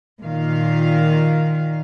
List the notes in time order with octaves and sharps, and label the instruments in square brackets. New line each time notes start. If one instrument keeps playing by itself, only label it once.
[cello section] A#2 D#3 F5